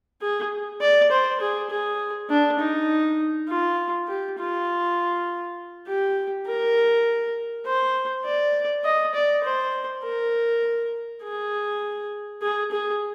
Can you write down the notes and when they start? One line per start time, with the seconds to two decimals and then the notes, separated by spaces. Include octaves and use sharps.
0.21 G#4
0.81 D5
1.11 C5
1.41 G#4
1.70 G#4
2.30 D4
2.59 D#4
3.49 F4
4.08 G4
4.38 F4
5.87 G4
6.46 A#4
7.66 C5
8.26 D5
8.85 D#5
9.14 D5
9.44 C5
10.03 A#4
11.23 G#4
12.42 G#4
12.71 G#4